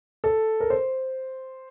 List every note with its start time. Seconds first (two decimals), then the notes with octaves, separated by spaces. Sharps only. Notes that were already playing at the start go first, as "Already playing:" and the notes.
0.24 A4
0.60 A#4
0.70 C5